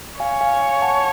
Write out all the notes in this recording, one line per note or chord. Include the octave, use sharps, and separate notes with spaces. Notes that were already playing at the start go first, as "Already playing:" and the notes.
C#5 F5 G#5
F5 G#5
F5 G#5
F#5 A5